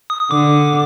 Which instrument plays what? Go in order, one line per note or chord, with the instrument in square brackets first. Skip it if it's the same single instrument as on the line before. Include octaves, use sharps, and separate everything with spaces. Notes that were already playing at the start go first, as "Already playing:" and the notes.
[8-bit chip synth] D#6
D#6
[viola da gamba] D3 [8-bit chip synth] D6